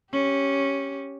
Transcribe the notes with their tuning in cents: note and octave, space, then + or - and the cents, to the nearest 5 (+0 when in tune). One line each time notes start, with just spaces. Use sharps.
C#4 +0 G4 +0